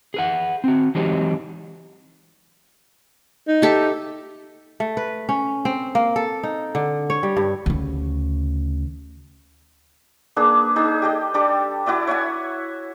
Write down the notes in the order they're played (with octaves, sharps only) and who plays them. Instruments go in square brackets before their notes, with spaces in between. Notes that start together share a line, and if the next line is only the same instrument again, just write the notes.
[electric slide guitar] G#4 B4 F#5
C4 F#4
E3 F#3 G#3 C4 D#4 G4
[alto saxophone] D#4
[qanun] G4 A4 E5
[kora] A3
B4
C#4
C4
A#3
A4
D#4
D3
C#5
G3
G2
[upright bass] D2 C#3
[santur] A#3 D4 G#4 B4
D#4 G#4
G4 A4 D#5
G3 D4 A4 D5
E4 F#4 D5 E5
C#5 E5 F#5 G#5